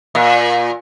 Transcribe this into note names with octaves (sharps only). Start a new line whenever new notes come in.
A#2